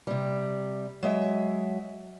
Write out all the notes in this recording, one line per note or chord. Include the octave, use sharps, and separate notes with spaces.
C3 G3
F#3 G#3 E5